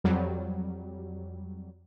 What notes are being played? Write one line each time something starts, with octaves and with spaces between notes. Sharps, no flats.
F2 F#3 G3